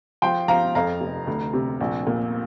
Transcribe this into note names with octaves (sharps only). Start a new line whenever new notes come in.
F3 G5 C6
F3 F5 A#5
F2 F5 A#5
F1
D2
C3
A#1
A#2